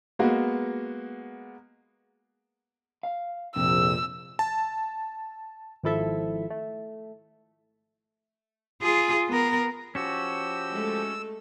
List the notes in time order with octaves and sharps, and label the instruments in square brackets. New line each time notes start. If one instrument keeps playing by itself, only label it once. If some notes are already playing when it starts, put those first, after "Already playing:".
[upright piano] G#3 A#3 B3 F#4
[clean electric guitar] F5
[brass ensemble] A#1 F2 [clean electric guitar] C3 [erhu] E6
[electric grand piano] A5
[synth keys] G#1 F3 E4 A4 E5
A3
[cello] F4 G#4
B3 A#4
[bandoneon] F3 G4 G6 [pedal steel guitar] C#4 F#4 [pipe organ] E6
[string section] G#3 A3 A4